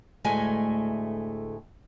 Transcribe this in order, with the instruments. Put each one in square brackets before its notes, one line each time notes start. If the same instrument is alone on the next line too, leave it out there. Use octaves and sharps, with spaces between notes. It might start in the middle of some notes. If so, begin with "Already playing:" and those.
[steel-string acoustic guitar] D2 A2 G#3 A3 G#5